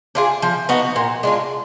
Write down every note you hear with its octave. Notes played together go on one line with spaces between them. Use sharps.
D4 F4 G#4
F3
B3 D#4 F#4
A#2
G#3 D4 F4